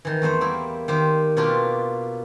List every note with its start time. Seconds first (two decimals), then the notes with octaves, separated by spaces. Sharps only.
0.05 D#3 E3
0.22 E2 A3 D#4 C5
0.41 G3 A#3 E4
0.88 D#3 G4 C5
1.37 B2 A#3 D4 F4 G4 D5